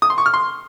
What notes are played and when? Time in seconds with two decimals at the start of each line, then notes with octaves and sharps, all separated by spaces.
0.02 D#6
0.10 C6
0.18 C#6
0.26 F6
0.34 C6